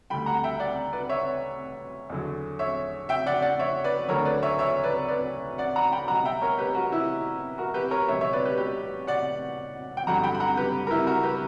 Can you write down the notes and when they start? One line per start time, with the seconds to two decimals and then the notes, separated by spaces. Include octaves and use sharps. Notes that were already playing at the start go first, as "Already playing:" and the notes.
0.10 D2 D3 G3 G5 B5
0.26 F#5 A#5
0.44 E5 G5
0.60 D5 F#5
0.93 B4 D5
1.09 C#5 E5
2.10 E2 D3 F#3
2.59 C#5 E5
3.09 E5 G5
3.26 D5 F#5
3.42 D5 F#5
3.60 C#5 E5
3.84 B4 D5
4.09 D2 D3 F#3 A#4 C#5
4.25 B4 D5
4.43 C#5 E5
4.59 C#5 E5
4.83 B4 D5
5.08 B4 D5
5.58 D5 F#5
5.76 F#5 A#5
5.92 G5 B5
6.08 B1 B2 G3 F#5 A#5
6.25 E5 G5
6.41 A#4 C#5
6.58 G4 B4
6.74 F#4 A#4
6.92 E4 G4
7.58 F#4 A#4
7.74 G4 B4
7.91 A#4 C#5
8.08 C#2 B2 G3 C#5 E5
8.21 C#5 E5
8.33 B4 D5
8.45 G4 B4
8.57 G4 B4
9.07 D5 F#5
9.97 G5
10.07 G1 G2 D3 F#3 F#5 A#5
10.23 G5 B5
10.35 B5
10.40 F#5 A#5
10.57 G4 B4
10.87 A#4
10.91 E4 G4
11.07 F#4 A#4
11.23 G4 B4